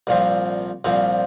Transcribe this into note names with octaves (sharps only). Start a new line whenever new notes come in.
C2 A#2 F3 C4
C2 A#2 F3 C4